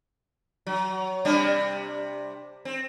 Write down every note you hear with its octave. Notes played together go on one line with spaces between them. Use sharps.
F#3
C3 G3 D4
C4